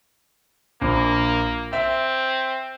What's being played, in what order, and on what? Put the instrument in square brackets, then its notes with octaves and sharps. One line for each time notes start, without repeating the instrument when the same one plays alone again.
[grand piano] A#1 [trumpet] A#3
[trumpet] C4 [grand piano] E5